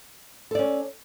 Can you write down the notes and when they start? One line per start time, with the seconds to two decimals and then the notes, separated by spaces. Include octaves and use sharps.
0.51 A4
0.55 D5
0.59 C#4